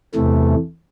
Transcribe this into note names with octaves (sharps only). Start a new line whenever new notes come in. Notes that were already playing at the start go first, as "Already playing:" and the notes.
E2 C3 E3 A3